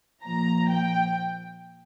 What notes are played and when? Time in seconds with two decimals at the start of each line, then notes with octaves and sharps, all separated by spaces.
0.24 A#2 F3 A#5
0.69 G5